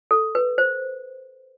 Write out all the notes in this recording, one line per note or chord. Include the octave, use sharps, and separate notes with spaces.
A4
B4
C5